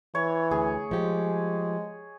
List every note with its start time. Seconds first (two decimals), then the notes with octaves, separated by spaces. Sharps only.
0.15 E3 C#5
0.51 D2 G#4
0.91 F3 G#3 G4